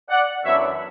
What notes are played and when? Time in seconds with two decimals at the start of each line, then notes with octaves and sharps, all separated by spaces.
0.09 D5 F#5
0.44 F#2 E3 B3 D4 C#5 E5